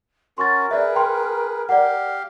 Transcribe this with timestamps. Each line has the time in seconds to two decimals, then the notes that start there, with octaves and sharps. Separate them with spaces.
0.38 C#4 F#4 A#4 C6 C#6 A6
0.71 G#4 B4 D5 E5
0.96 G5 C6
1.69 G4 D5 F5 F#5